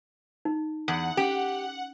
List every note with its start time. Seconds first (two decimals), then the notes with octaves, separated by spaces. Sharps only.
0.45 D#4
0.88 E2 F#5
1.17 C#4 G4